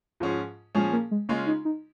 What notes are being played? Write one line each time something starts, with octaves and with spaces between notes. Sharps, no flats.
G#2 F3 C#4 F4 G#4
A#2 F3 G#3 C#4 G#4
A#3
G#3
C#3 G#3 A#3 C#4 F4
D#4
D#4